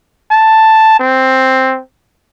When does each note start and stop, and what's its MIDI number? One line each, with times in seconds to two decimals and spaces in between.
0.31 0.95 81
1.00 1.80 60